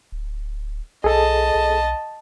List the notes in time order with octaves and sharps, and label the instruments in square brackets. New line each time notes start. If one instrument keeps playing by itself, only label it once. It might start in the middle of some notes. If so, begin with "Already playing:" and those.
[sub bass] D1
[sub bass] B1 [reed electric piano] G#4 A4 [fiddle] D#5 A5
[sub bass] B1